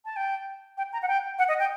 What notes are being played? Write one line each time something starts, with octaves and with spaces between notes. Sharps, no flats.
A5
G5
G5
A#5
F#5
G5
F#5
D#5
G5